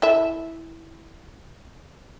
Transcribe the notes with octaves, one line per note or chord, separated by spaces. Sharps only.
E4 A4 E5